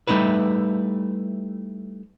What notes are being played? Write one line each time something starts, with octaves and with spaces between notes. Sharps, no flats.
G3 A3 D#4 E4 B4